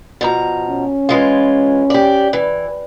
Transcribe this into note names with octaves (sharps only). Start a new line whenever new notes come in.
B2 F3 A#5
C#4
E3 G#3 F4
G4 D5
E3